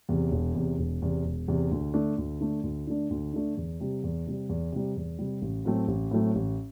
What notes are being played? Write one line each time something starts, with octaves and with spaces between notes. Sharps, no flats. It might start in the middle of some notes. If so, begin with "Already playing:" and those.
E2 C3
E1
E2 C3
E1
E2 C3
E1
E2 C3
D2
D3 A3 D4
D2
D3 A3 D4
D2
D3 A3 D4
D2
D3 A3 D4
E2
C3 G3
E2
C3 G3
E2
C3 G3
E2
C3 G3
A1
A2 F#3 A3 C4
A1
A2 F#3 A3 C4
A1